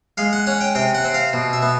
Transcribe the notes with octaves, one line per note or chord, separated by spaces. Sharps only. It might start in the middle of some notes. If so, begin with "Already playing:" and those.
G#3 F5
F#5
C#4 F#5
G5
C3 G5
F#5
C4
F5
B2
E5
B3